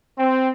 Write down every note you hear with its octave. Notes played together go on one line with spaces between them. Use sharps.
C4